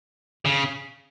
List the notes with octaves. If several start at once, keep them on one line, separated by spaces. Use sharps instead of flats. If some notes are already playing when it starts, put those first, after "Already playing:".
C#3